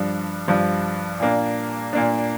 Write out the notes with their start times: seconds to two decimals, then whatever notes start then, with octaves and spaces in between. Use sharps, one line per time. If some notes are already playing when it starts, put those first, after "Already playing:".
Already playing: G2 F3 D4
0.48 G2 F3 D4
1.20 A#2 A#3 D4
1.93 A#2 A#3 D4